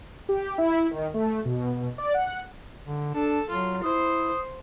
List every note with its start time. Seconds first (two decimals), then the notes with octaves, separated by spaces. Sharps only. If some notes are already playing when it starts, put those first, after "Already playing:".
0.29 G4
0.58 E4
0.91 D#3
1.14 A3
1.45 B2
1.98 D5
2.14 F#5
2.84 D3
3.15 D4 A4
3.50 F#3 F4
3.83 E4 C5 D#6